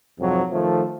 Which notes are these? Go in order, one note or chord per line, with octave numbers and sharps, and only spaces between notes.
F2 G#2 C3 F#3
D#3 F3 A3